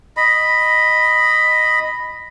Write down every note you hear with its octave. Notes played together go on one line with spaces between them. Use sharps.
D#5 B5